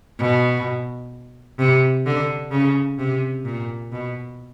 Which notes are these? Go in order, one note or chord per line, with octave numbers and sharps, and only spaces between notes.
B2
C3
D3
C#3
C3
A#2
B2